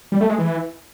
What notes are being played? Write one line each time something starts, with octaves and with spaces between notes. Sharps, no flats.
G3
A3
G#3
E3